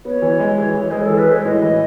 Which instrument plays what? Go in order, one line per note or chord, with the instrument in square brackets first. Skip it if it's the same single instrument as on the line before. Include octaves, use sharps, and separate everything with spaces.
[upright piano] B3 [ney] C#5
[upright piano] E3
G#3
E3
E3
[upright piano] G#3 [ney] G#4
[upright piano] E3 [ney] A4
[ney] B4
[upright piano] G#3 [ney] C#5
[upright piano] A2 [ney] D#5
[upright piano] E3